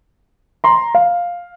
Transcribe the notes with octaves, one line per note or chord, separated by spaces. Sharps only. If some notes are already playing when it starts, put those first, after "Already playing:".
A#5 C6
F5